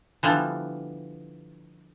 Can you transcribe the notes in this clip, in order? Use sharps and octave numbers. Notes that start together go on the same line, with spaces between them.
D3 E3 F3 G3 B3